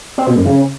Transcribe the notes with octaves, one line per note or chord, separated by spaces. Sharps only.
C4
B2
F#2
C#3